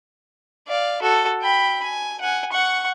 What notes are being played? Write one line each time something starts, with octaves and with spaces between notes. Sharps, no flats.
D5 F5
F#4 A4
G5 B5
G#5
F#5 G#5
F#5 C#6